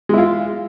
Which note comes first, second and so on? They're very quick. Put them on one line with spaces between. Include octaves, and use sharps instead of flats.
G#3 E4 F4